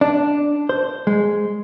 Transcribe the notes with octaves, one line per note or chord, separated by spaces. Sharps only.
D4
C5
G#3